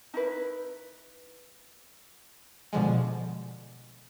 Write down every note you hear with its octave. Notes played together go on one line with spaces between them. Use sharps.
D#4 E4 B4
B2 D3 F3 G#3